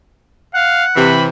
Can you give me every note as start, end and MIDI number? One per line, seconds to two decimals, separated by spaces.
0.55 0.84 77
0.55 1.12 78
0.96 1.28 48
0.96 1.28 52
0.96 1.24 83